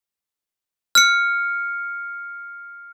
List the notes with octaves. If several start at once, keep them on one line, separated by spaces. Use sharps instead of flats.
F6 C#7